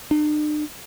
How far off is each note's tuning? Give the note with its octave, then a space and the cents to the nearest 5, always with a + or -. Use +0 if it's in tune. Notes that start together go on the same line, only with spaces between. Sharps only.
D4 +45